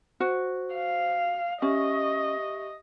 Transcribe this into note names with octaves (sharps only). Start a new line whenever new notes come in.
F#4 C5
F5
C#4 G4 D#5 E5 C#6